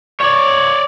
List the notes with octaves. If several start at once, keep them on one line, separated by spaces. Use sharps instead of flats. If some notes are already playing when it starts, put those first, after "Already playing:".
C#5 D5